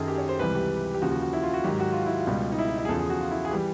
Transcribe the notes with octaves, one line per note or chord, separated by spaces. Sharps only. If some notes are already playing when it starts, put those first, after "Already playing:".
Already playing: F#2 D#3 F#3 G#4 A4
G4
C#5
C5
C#2 C3 E3 G3 B4
G4
G4
D#2 C#3 F3 F#4
F#4
F#4
E4
F4
F#4
G#2 D#3 F#3 G4
F#4
F4
E4
F4
C#2 B2 G3
D#4
E4
D#4
E4
G#4
E2 C#3 F3 A4
G#4
F#4
F4
E4
G#4
E3 G3 G4